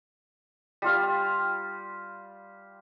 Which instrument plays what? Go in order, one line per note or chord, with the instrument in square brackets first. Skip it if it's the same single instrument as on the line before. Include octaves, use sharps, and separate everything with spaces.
[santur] G3 F4 F5